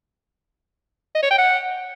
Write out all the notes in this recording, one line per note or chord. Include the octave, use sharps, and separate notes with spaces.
D#5
C#5
G5
F#5